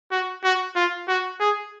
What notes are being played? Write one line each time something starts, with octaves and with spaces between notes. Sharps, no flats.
F#4
F#4
F4
F#4
G#4